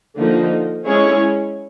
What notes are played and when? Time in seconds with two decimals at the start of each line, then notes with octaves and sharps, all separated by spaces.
0.16 D3 F3 A#3 D#4
0.86 G#3 C#4 E4 G#4 C#5